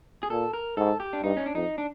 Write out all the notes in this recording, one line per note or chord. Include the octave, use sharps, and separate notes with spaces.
G#4
A#2 A4
A#4
G#2 A4
G4
D4
G2 D#4
C#4
D4
F2 D#4
D4